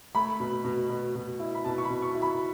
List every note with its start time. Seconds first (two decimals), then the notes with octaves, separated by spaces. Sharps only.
0.15 A3 B5
0.40 B2
0.64 B2
0.90 B2
1.15 B2
1.40 E4
1.54 B5
1.65 B2 A5
1.78 C#6
1.84 B5
1.90 B2
2.02 C#6
2.15 E4
2.22 B5